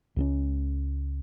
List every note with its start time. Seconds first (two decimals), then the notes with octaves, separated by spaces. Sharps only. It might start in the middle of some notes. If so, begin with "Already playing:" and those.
0.16 C#2 G3 C#4